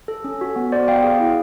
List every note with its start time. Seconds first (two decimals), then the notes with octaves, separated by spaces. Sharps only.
0.08 A4
0.24 C#4
0.41 F#4
0.56 B3
0.72 B3 C5 D5
0.88 B3 F5 G5
1.04 G#4
1.20 E4